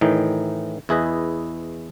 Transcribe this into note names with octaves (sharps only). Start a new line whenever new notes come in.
A2 D#3 E3 D#4
E2 E4 G#4 B4 D#5